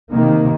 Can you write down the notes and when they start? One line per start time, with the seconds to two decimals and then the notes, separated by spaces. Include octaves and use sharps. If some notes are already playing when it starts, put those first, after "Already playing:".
0.13 C3 D#3 A#3